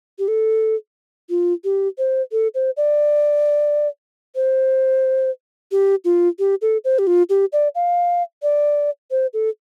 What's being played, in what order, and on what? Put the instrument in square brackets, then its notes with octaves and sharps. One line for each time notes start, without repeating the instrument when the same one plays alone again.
[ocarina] G4
A4
F4
G4
C5
A4
C5
D5
C5
G4
F4
G4
A4
C5
G4
F4
G4
D5
F5
D5
C5
A4